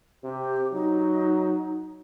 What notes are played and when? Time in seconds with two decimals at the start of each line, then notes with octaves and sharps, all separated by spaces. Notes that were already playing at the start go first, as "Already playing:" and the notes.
0.24 C3 G4
0.72 F#3 D#4